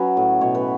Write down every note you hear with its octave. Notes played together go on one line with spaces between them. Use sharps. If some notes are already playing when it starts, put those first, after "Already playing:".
Already playing: F#3 C#4 F#4 B4
A2
B2 C#5
B4